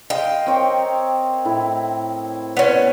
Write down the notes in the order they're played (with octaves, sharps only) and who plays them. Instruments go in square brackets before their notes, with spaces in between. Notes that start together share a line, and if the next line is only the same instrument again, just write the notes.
[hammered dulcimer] D#5 F5 C6 [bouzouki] G5
[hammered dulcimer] C4 A#4 C#5
A2 E4
[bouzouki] B3 C#4 [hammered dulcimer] C5